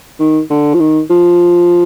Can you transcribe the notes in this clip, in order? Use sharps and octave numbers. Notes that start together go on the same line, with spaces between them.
D#3
D3
F3
D#3
F3